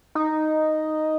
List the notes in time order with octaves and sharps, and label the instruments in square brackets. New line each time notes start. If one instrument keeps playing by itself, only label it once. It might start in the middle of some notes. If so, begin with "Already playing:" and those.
[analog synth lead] D#4